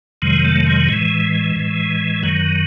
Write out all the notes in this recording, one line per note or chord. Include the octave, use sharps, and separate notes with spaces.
F2 C3 D#3 F#3 G#3
A3
G#3
A2 E3 G#3
A2 E3
F#2 D#3 F#3